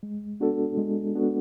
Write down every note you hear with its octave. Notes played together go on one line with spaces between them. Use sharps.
G#3
B3 D4 F#4 A4
G#3
B3 D4 F#4 A4